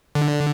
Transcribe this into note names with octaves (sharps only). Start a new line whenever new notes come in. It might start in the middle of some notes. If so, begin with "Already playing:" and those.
D3